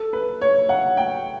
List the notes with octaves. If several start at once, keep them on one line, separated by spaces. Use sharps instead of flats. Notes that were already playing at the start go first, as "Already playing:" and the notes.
Already playing: A4
B4
C#5
F#5
G5